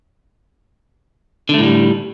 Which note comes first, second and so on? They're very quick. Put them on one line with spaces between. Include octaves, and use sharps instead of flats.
D3 A3 A2 G3